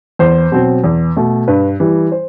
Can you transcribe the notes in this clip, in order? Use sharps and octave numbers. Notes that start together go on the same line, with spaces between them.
E2 C5
B2 F#3 C4
E2
B2 A3
G2 B4
E3 G3
C5